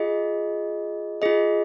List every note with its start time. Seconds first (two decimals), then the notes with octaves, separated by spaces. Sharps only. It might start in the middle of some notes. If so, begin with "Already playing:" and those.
Already playing: F4 G#4 D#5
1.22 F4 G#4 D#5